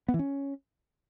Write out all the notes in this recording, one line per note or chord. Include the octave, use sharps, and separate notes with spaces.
B3
E3
C#4